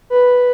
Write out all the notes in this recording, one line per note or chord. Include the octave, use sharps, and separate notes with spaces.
B4